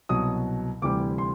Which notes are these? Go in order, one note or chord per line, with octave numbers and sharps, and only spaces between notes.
C2 B2 F#3 D#6
D2 C3 E3 G3 D6
C6